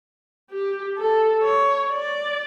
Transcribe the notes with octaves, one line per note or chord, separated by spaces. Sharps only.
G4
A4
C#5
D5